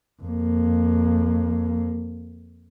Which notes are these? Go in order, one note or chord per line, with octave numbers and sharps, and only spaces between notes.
F2 A#3